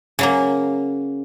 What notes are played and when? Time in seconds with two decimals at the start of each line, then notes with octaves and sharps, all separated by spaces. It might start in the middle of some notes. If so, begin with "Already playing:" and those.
0.19 C#3 F#3 A#3